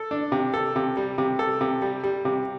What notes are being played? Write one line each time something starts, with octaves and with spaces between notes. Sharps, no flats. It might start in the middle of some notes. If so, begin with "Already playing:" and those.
Already playing: A4
D4
C3
A4
C3
G3
C3
A4
C3
G3
G3
C3